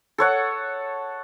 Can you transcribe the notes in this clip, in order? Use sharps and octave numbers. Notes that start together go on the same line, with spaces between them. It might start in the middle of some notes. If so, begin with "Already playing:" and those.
A4 C#5 F#5